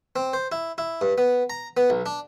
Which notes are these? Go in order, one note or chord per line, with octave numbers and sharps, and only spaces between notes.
C4
C5
E4
E4
G2
B3
A#5
B3
B1
D4